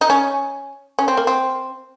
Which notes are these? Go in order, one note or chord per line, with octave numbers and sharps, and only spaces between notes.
D#4
C#4
C#4
C4
A#3
C4